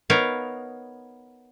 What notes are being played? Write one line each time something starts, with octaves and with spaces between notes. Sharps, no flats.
B3 D#4 A#4 C#5 F5